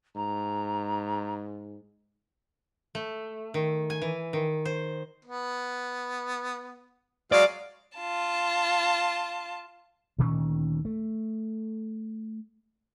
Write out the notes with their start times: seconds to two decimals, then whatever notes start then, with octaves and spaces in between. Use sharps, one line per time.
0.15 G#2 A#5
2.95 A3
3.54 D#3
3.90 G#5
4.02 E3
4.33 D#3
4.65 C5
5.25 B3
7.32 F#3 G#3 D5 F5
7.97 F4 A5
10.19 D2 A#2 D#3 C#4
10.85 A3